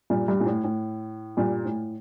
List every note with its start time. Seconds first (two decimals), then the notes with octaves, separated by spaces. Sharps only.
0.10 G2 A#2
0.28 G2
0.40 A#2
0.46 A2
0.64 A2
1.37 G2 A#2
1.65 A2